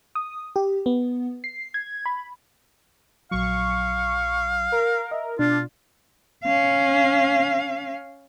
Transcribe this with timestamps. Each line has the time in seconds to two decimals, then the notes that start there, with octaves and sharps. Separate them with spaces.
0.15 D#6
0.56 G4
0.86 B3
1.44 C7
1.74 G#6
2.06 B5
3.31 A#1 F#3 F5 C#6
4.72 A#4
5.11 D#5 E5
5.39 B2 D4 F4
6.44 C#4 F5